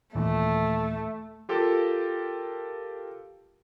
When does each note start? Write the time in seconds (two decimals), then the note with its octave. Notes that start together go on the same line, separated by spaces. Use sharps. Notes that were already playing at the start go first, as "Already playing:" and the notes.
0.15 D#2 A#2 E3 A3
1.49 F4 G4 A4 A#4